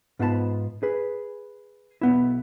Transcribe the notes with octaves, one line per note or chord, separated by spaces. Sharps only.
G#2 B3 F4 G4 A5 B5
G#4 B4
B1 B3 E4